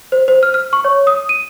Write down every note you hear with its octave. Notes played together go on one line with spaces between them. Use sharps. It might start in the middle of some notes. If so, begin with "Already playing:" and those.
C5
C5
F6
F6
C#6
C#5
D#6
D#7